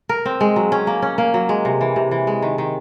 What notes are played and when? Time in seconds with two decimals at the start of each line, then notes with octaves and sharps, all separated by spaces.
0.09 A#4
0.25 C4
0.41 G#3
0.56 F#3
0.72 C#4
0.87 A#3
1.02 C#4
1.18 A#3
1.34 F#3
1.49 G#3
1.65 C3
1.81 E3
1.96 C3
2.11 E3
2.27 G#3
2.42 D#3
2.58 D#3